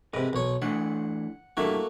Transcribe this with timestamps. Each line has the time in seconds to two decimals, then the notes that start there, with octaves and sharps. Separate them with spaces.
0.14 G#2 C3 A#4 B4
0.33 B1 C#5
0.62 E3 A3 D4 F#5
1.57 G2 A3 A#3 D4 E4 F#4